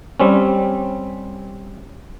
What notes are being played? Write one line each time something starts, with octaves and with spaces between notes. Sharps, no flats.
G3 C4 C#4